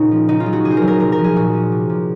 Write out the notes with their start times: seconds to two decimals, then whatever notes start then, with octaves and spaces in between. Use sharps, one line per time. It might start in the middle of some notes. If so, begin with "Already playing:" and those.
Already playing: A#2 C#3 C#4 D#4
0.11 F3
0.29 C#3 D#4
0.40 F4
0.46 F#3
0.53 F#4
0.65 C3 G#4
0.71 C5
0.77 A#4
0.82 F#3
0.88 A#4
1.00 C3 A#4
1.12 A#4
1.18 F3
1.24 G#4
1.36 A#2 F#4
1.54 F3
1.72 C3
1.90 F3